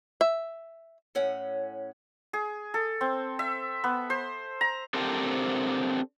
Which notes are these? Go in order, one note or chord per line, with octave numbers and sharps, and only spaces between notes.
E5
A2 C#4 F#5
G#4
A4
C4
E5
B3
C5
A#5
C4 D4 G4 A4 A#4 C5